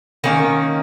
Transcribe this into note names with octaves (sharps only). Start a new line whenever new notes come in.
D#3 A#3 C#4